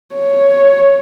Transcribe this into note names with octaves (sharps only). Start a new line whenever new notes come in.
C#5